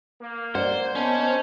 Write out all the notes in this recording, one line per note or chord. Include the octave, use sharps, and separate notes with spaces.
A#3
C5 D5 F#5
G#1 B3 C#4 C5 D#5 A5